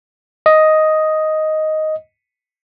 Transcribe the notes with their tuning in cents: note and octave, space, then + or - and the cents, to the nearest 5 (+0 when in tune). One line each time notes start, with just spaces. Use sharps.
D#5 +5